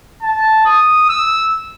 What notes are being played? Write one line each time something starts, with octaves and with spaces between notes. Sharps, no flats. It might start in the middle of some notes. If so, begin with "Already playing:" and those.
A5
D#6
E6